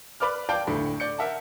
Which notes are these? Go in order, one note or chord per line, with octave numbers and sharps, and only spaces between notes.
B4 D5 D6 F6
D5 F5 G5 A5 G6
D2 A2 D3 A3
D5 G6 C#7
A#4 E5 F#5 A5